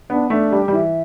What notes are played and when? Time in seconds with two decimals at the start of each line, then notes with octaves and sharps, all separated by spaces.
0.09 B3 D4
0.30 A3 D4
0.52 G3 G4
0.68 G3
0.73 E3 E5